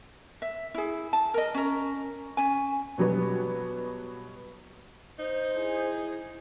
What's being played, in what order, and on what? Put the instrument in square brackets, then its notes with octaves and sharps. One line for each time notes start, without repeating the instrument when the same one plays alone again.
[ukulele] E5
E4 G#4
A5
A#4 D#5
C#4 A#4
C#4 G#5
[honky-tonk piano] B2 F#3 G3 B3
[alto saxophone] D#4 [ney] C5
[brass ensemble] E4 G#4